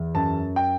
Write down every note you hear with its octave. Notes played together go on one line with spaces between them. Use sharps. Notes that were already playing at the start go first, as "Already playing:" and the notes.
Already playing: E2
F#2 A5
G5